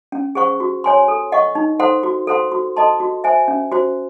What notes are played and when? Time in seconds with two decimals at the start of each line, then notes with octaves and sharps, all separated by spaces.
0.12 C#4
0.35 G#4 C5 F#5 C#6
0.60 F#4
0.84 C#5 G#5 C6
1.08 A4
1.32 D#5 F#5 C#6
1.55 D#4
1.80 A4 C5 F#5 C6
2.03 F#4
2.27 A4 C5 F#5 C6
2.52 F#4
2.77 A4 D#5 A5 C6
3.00 F#4
3.24 C5 E5 G#5
3.48 C#4
3.72 F#4 C5